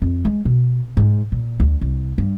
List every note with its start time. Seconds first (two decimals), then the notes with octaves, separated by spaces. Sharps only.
0.02 F2
0.25 G#3
0.45 B2
0.97 G#2
1.32 A#2
1.60 D2
1.81 C2
2.18 G2